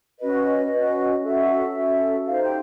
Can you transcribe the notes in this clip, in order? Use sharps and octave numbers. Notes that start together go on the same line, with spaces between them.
C#4 F#4 B4 D#5
C#4 F#4 B4
C#4 F#4 A4 E5
C#4 F#4 A4
D#4 G4 C5 F5
G5